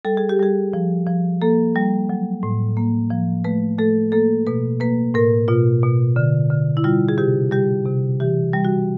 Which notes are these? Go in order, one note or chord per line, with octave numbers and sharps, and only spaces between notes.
G3 A4
G#4
G4
G3 G#4
F3
F3
A#3 A4
G3
F#3
A2
A#3
F3
A3 B4
A3 A4
A#3 A4
B2 B4
A#3 B4
A2 A#4
B2 F4
B2
D3
D3
E4
G3 F4
G#4
C3 G4
G3 G4
C3
E3 G4
G3
F#4